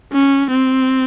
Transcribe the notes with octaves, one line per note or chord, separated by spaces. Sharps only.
C#4
C4